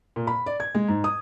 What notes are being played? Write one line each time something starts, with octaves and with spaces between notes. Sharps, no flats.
A#2
B5
D5
G#6
G#3
G#2
D#6